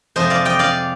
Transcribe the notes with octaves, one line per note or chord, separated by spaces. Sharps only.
F2 C3 F3 G#3 C5 D#5
D5 F5
D#5 G5
D5 F5